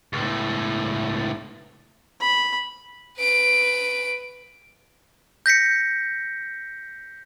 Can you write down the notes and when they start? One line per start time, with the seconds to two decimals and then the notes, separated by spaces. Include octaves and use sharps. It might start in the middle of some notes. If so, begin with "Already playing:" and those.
0.13 C#2 A2
2.21 B5
3.19 B4 D7
5.46 G6 A#6 B6 C#7